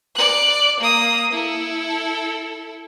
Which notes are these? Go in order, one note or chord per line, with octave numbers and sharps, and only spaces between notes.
D5 F#6
A#3 D#6
E4 A4